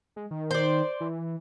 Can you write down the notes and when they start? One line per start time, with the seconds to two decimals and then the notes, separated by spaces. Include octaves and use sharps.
0.16 G#3
0.31 D#3
0.51 C5 D5
1.01 E3